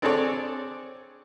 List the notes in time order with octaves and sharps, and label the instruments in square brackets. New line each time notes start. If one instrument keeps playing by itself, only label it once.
[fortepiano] C4 D4 G#4 A4 C#5 D5